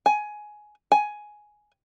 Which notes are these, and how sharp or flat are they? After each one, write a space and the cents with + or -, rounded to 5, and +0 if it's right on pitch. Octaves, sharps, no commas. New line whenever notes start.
G#5 +15
G#5 +10